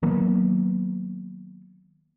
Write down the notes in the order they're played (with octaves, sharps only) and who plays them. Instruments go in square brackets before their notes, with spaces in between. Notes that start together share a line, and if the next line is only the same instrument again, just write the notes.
[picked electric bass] D#3 F#3 A#3 B3